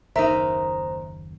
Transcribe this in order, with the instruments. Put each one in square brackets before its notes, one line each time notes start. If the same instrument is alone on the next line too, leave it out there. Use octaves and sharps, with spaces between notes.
[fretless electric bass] F#1 D#2 [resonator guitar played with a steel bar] D#4 A#4 E5 [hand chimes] C5 A#5